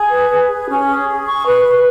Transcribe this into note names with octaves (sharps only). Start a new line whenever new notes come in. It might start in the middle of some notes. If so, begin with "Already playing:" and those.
Already playing: G#4
B4
B4
G#4
C#4
G#4
G#4
C#6
B4
B4